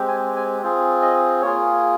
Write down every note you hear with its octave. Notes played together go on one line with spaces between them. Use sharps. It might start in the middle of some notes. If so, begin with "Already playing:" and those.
Already playing: G#3 C4 G4
G#5
G#5
C4 F4 G#4
D#5
A#3 F4 G#4 C#5